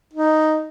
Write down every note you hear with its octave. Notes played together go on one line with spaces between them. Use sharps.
D#4